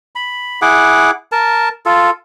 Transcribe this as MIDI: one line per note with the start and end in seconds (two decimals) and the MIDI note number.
0.16 0.60 83
0.62 1.11 64
0.62 1.11 68
0.62 1.11 78
0.62 1.11 86
1.32 1.69 70
1.32 1.69 81
1.86 2.10 65
1.86 2.10 69